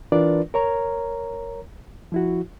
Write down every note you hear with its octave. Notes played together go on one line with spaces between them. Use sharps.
E3 D4 F4 A#4 B4 D5
A#4 C#5 A#5
F3 E4 F#4